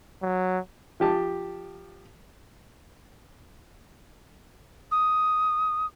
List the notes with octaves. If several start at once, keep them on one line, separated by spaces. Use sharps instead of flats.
F#3
F3 G4 A5
D#6